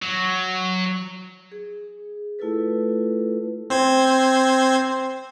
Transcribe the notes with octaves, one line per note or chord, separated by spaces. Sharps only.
F#3
G#4
A3 E4 F4 A4 B4
C4 C5 G#6